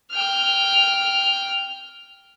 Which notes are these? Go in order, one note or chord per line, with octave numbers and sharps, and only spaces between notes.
G5 F6